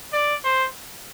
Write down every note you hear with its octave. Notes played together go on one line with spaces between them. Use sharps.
D5
C5